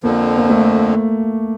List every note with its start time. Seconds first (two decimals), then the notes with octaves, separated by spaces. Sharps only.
0.03 F2 D3 F3 A#3
0.38 A#3
0.50 A3